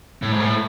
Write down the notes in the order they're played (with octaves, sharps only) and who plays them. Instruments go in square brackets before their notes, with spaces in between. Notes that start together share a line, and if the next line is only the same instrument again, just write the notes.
[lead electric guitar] A2
G#2
A2